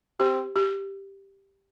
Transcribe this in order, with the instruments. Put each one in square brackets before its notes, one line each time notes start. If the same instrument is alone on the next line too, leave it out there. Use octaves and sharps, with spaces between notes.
[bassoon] C4 [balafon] G4
[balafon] G4